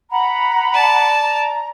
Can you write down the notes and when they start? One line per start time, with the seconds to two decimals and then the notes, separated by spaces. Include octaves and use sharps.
0.11 F#5 A#5 B5
0.74 D5 A5
1.20 A#5